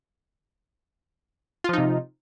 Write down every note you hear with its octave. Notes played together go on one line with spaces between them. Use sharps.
C3 F3 D#4 F4